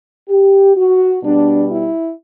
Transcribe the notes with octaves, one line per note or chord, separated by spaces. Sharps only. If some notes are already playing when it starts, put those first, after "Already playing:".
G4
F#4
B2 G3 B3 D4
E4